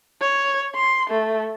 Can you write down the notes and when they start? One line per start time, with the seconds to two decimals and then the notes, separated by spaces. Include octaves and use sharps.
0.22 C#5
0.76 C6
1.10 A3